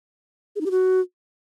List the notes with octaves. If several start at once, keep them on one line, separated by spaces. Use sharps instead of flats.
G#4
D#4
G4
F#4